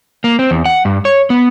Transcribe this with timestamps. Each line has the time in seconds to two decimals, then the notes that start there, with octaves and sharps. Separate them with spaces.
0.24 A#3
0.39 C4
0.51 E2
0.66 F#5
0.85 G2
1.05 C#5
1.30 B3